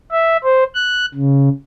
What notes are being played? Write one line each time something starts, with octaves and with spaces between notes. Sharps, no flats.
E5
C5
F#6
C#3